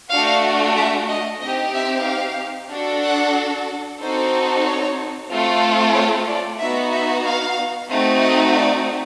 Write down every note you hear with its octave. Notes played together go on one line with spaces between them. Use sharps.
A3 D4 F#4 F5
E5
D#5
C4 D#4 G4 D#5
E5
F5
D4 F#4 A4
F#5
C4 D#4 F#4 A4 C5
C#5
A3 C4 F4 A4
C#5
D5
B3 D#4 F#4 E5
E5
F5
A3 C4 D#4 F#4
D#5
D5